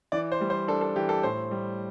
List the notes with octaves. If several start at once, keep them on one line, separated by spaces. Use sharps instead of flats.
E3 D5
C5
G3
C5
D4 A4
A4
E3 G4
A4
A2 C5
G3